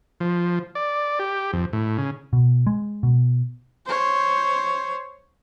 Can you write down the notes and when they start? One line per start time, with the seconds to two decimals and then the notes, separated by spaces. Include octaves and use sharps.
0.20 F3
0.75 D5
1.19 G4
1.53 F2
1.73 A2
1.98 C#3
2.33 B2
2.67 G#3
3.03 B2
3.86 C5 C#5